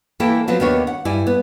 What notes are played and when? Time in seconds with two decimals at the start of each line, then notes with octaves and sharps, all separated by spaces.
0.20 E3 A#3 E4 A4 G5 A5
0.48 F3 F#3 B3 C4
0.60 D#2 D#3 B3 D4 C#5
0.87 F#5
1.05 G2 E4 D5 G#5
1.27 B3